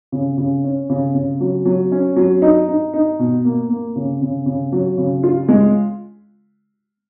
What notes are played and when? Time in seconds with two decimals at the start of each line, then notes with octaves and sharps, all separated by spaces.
0.12 C#3
0.38 C#3
0.64 C#4
0.90 C#3
1.15 C#3
1.40 F#3
1.65 F#3
1.92 C#4
2.16 F#3
2.42 D#4
2.68 D#4
2.94 D#4
3.19 B2
3.45 A#3
3.69 A#3
3.96 C#3
4.22 C#3
4.46 C#3
4.72 F#3
4.98 C#3
5.23 F4
5.49 G#3